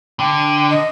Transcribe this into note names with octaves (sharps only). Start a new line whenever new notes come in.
D3 G5
D#5